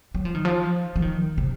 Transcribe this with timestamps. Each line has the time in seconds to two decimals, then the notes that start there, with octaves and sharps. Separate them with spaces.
0.15 F#3
0.25 F3
0.35 D#3
0.45 F3
0.96 F3
1.02 D#3
1.38 C3